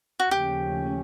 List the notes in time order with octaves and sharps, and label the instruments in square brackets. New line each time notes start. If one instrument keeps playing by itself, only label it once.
[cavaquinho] F#4
[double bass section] D#2 C#3 F3 A3 C#4 [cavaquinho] G4